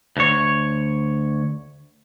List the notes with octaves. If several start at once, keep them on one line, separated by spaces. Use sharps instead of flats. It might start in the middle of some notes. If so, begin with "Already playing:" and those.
D2 C#5